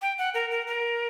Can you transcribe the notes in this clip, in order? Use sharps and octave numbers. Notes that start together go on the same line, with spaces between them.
G5
F#5
A#4
A#4
A#4